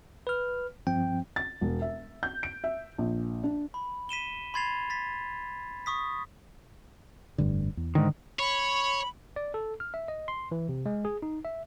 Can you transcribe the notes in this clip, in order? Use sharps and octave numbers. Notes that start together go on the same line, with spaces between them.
B4 F6
G2 F3 C4 G5
A6
E1
E5
G6
D7
E5
A#1
D4
B5
B6 D#7 E7 G7
B5 C6 G#6 A6 C7 F7
A6 B6
C#6 D#6 B6
F1 G2 D3
E2
G#2 D3 D#3
C#5 B5
D5
A4
F6
E5
D#5
C6
E3
C3
G#3
G#4
D#4
E5